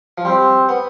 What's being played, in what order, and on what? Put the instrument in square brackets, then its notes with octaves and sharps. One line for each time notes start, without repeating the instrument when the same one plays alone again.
[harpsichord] F3
[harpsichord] G3 [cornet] C4
[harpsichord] B3